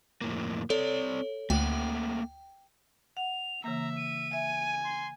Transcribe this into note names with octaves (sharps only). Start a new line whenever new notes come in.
F2 A2 A#3
C4 A4 C#5 D5
D2 A3 A#3 F#5 G5
F#5 F7
C#3 E3 A#3 E5 A#5
D#7
E5 G#5
C6